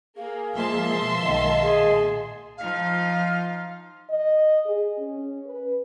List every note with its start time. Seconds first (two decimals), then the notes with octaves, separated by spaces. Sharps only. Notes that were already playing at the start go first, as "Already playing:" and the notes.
0.17 A#3 G#4 F5
0.54 F3 G#3 A#3 E5 A5 C6
0.91 B2 F3
1.25 B1 D#3 G#3 D#5 F5
1.62 A#2 G#4
2.57 F3 D#4 F4 F5
4.10 D#5
4.66 G#4
4.98 C#4
5.46 B4